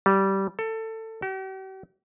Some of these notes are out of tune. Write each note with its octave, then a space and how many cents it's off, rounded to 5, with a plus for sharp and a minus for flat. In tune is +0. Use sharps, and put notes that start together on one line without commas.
G3 -15
A4 +20
G4 -45